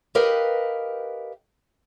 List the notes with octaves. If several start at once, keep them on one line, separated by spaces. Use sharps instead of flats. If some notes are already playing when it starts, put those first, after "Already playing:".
G4 A#4 B4 D#5 F5 G5